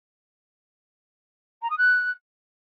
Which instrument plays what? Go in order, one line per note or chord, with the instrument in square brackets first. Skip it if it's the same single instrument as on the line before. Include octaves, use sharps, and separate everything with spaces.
[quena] A#5
D#6
F#6